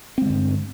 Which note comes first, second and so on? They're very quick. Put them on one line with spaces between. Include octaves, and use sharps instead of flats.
C4 G#3 D3 G2